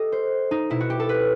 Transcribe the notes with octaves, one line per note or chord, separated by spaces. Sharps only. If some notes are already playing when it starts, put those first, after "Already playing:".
Already playing: G4 A4 D#5
C5
D#4
B2 E4
F#4
G4
A4
B4